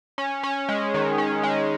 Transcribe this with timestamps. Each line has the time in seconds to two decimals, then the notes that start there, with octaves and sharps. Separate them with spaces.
0.18 C#4
0.43 C#4
0.69 G#3
0.94 D#3
1.18 C#4
1.43 G#3